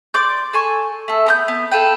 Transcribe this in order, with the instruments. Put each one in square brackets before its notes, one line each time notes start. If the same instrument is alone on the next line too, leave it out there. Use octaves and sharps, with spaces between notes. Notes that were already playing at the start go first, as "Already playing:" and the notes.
[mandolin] D5 C6 D6 G6
A4 G#5 C#6
A3 A4
B3 A#5 G6
B3
F4 A4 B4 G5